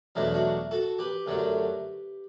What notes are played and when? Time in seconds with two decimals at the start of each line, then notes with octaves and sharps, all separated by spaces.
0.15 E2 B2 F#3 A3 D4 E4
0.34 D4 F#4
0.71 F#4 A4
0.99 G4 B4
1.26 F#2 D3 F#3 A3